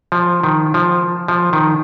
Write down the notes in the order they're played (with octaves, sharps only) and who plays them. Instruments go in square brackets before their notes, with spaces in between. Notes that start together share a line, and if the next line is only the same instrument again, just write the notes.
[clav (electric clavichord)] F3
D#3
F3
F3
D#3